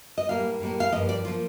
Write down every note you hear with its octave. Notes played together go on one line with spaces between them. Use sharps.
D#5
A2 G3 A#3 F5
A2 G3 A#3
F5
G2 F3 A#3 D#5
D5
F3 A#3 F4